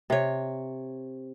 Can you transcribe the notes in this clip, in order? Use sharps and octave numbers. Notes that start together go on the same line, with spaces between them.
C3 C#5